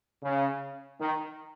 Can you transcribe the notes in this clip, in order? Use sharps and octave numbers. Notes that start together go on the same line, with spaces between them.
C#3
D#3